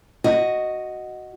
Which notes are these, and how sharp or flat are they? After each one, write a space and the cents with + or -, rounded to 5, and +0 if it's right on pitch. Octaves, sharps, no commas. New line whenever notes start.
F#4 +0 D#5 +0